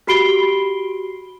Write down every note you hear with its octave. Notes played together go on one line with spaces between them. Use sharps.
F#4 G4 B5 C7 D7 G7